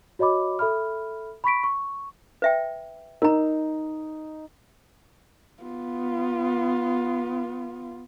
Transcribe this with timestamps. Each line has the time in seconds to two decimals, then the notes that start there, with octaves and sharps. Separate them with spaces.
0.19 F#4 C#5 D#5 B5 D6
0.59 A4 E5 B5 F6
1.44 B5 C#6 B6 D7
1.64 C#6
2.42 B4 E5 G5
3.22 D#4 A#4 A#5
5.62 B3 F4